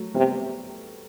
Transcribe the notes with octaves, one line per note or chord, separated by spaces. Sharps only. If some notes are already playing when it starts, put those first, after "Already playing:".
Already playing: F#3 A3
C3 G3 B3